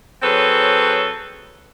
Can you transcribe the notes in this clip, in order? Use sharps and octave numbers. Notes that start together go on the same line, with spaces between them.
F#3 C4 G#4 A4 B4 C#5